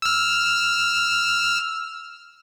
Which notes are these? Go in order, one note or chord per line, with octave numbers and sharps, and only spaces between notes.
E6 F6